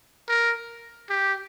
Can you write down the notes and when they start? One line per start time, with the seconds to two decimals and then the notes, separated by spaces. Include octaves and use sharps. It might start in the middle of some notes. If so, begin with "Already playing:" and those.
0.29 A#4
1.10 G4